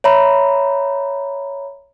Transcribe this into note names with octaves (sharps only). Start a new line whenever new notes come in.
C#5 E5 A#5 B5